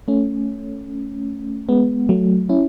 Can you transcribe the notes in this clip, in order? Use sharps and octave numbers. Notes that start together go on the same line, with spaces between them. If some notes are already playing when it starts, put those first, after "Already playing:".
A3 C#4
G#3 B3
F#3 A3
C#4 E4